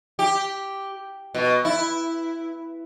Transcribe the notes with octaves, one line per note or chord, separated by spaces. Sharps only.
G4
B2
E4